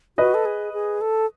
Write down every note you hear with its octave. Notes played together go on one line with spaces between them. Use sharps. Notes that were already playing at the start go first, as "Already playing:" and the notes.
F#4 B4 D#5
A4
G#4
G#4
A4